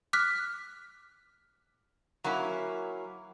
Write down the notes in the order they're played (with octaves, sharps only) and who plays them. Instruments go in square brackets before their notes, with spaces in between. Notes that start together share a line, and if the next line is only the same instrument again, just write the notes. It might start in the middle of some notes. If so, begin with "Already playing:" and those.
[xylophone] D6 F6 F#6 B6
[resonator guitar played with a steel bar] F#3 A#3 C#4 E4